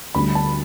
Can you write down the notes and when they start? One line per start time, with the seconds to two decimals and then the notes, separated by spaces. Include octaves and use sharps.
0.15 D2 D3 G3 B5
0.35 A5